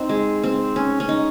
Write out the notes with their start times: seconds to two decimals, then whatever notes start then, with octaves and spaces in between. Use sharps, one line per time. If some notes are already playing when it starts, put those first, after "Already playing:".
Already playing: C4 D#4
0.09 G#3
0.44 C4
0.76 C#4
1.00 C#4
1.09 D#4